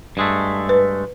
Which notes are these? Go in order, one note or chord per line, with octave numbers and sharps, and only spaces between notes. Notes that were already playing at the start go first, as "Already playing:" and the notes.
G2 G#3 A3
B4